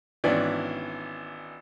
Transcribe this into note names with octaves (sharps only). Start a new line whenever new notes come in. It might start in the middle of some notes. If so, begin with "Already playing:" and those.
G#1 E3 B3 C#4 D4 D5